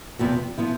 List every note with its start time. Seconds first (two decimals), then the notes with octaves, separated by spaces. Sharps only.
0.19 E2 C3 F3 B3
0.58 F3 B3 E4